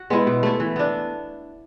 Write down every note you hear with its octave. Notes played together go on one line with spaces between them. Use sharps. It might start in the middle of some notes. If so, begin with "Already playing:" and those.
Already playing: F#4
G#3 B3 E4
B2
A3 E4 A4
E3
B3 D4